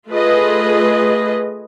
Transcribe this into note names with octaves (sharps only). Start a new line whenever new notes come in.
A3 F4 G#4 B4 D#5